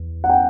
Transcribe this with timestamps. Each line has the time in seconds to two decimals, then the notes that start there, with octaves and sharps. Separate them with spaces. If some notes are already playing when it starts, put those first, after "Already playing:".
Already playing: E2
0.24 F#5
0.29 G5